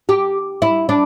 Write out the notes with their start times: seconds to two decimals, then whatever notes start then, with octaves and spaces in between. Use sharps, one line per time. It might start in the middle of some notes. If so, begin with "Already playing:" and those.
0.09 G4
0.62 E4
0.89 D4